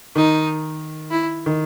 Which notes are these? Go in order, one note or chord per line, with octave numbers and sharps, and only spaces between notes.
D#3 D#4
E4
D#3